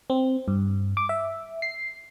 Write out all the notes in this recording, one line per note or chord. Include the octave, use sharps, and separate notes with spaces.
C4
G2
D6
E5
C7